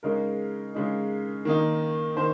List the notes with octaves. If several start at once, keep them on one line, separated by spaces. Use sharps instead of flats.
C#3 G#3 D#4 A#4
C#3 G#3 D#4
D#3 A#3 D#4
D#3 C5